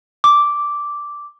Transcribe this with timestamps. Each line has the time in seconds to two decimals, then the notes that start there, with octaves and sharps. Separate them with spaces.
0.24 D6